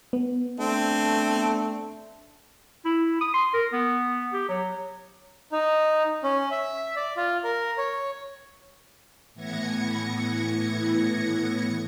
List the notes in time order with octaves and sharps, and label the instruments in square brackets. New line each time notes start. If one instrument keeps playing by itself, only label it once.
[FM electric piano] B3
[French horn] A3 [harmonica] C4 [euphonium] D4
[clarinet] E4
D#6
C6
A#4
B3
G4
F#3
[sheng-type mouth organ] D#4
C#4
E5
D5
F4
A#4
C#5
[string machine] A2 E3 B3 G#6 A#6 C#7